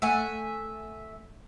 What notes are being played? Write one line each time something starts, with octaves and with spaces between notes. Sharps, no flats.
A3 E5 F#5 G#5